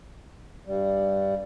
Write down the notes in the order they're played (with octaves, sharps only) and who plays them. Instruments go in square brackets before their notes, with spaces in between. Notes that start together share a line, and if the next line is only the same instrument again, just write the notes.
[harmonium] G2 G3